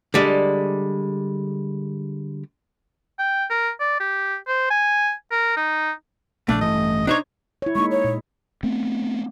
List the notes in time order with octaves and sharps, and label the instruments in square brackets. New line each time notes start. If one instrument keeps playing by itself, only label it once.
[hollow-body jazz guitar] D3 G3 G#3
[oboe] G5
A#4
D5
G4
C5
G#5
A#4
D#4
[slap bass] A#1 C#3 [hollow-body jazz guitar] A3 [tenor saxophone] D4
[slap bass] A1 G2 E3 [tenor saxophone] D#5
[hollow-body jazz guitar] D4 C5 C#5 [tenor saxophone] D#4
[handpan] E4 C#5
[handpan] G#3 A#3 D#4 [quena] C#6
[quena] C#5
[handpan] A#2
[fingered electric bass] A3 B3 C4